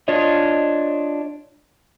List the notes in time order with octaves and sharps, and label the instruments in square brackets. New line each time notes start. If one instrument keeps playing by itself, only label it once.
[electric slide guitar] D4 F4 C#5 D#5